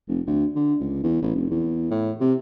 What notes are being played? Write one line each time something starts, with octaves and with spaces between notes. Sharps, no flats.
F1
D2
D3
C#2
E2
A1
F1
E2
A2
C3